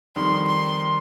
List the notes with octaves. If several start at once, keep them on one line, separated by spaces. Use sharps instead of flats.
F2 D#3 G3 C6
C6